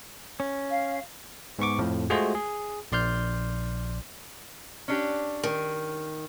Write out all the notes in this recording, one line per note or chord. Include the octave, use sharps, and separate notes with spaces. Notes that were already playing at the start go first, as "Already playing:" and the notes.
C#4
F5
G#2 B3 C#6 D6
F2 A2 F3
G#3 A3 F4 F#4 G#4 C5
G#4
A#1 D5 C6 F6 G6
C#4 D4 G4
D#3